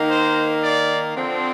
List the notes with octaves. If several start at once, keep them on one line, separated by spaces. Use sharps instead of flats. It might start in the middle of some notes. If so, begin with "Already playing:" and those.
Already playing: D#3 A#3 D#4
C5
D5
D3 F3 C4